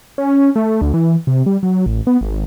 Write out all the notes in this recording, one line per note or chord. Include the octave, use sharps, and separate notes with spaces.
C#4
A3
D2
E3
C3
G3
F#3
A1
B3
G#1